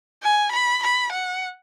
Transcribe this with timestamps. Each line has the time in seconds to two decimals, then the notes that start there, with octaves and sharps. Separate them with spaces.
0.23 G#5
0.52 B5
0.83 B5
1.12 F#5